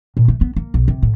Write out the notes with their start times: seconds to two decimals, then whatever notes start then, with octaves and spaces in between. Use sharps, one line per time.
0.17 A#2
0.28 A3
0.41 B3
0.56 A#3
0.74 B1
0.88 C3
1.02 A2